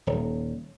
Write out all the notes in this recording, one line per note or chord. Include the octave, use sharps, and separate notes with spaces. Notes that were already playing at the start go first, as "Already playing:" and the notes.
D#1